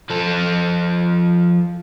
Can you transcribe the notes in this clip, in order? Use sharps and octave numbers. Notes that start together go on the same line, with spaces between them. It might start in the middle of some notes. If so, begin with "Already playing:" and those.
F3 A4